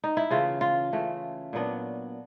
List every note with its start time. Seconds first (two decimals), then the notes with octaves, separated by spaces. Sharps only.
0.04 D#4
0.17 E4
0.30 C#3 E3 A3 F4
0.61 F4
0.92 C#3 E3 A3
1.53 A#2 F#3 B3 D4